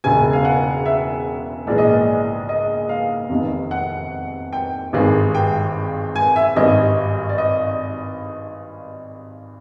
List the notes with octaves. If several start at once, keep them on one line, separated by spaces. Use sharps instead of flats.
E1 E2 C#3 G#5
F5
F#5
E5
A#1 G#2 E3 G#3 D5
D#5
D5
D#5
F5
F1 E2 C3 D#3
F#5
G5
G#1 G2 D#3 G#3
G5
G#5
E5
G#1 G2 D#3 G3 D#5
D5
D#5